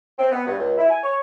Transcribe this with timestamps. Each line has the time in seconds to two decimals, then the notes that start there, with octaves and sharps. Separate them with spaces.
0.19 C4
0.31 B3
0.47 G2
0.59 C#2
0.78 E4
0.89 G#5
1.03 C#5